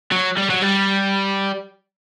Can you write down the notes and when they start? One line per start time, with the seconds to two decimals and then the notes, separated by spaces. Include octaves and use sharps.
0.12 F#3
0.37 G3
0.50 F#3
0.62 G3